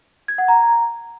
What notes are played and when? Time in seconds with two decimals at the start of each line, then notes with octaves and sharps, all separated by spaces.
0.28 G#6
0.38 F#5
0.48 A#5